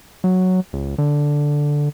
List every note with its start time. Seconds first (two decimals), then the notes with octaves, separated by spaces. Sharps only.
0.24 F#3
0.73 C#2
0.98 D3